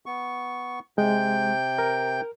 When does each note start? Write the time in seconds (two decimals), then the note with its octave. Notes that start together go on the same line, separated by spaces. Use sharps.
0.06 B3 C#6
0.98 C3 G#3 G5 G6
1.78 A#4